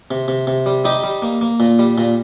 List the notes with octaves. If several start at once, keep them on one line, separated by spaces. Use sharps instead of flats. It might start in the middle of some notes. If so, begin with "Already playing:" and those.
C3
C3
C3
G3
G3 D#4 G4
G3
A#3
A#3
A#2
G3
A#2